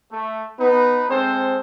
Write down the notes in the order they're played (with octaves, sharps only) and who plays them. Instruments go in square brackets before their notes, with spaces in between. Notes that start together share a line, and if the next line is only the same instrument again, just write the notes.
[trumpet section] A3
[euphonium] B3 [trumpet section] D#4 B4
[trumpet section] G#3 A4 C5 [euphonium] C4